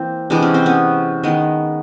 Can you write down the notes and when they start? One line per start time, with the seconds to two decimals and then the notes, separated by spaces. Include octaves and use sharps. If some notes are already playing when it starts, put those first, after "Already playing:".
Already playing: E3 A#3 C4
0.30 C3 E3 G#3 B3 D4
0.42 C#4
0.54 C4
0.66 B3 C#4
1.23 D#3 G#3 B3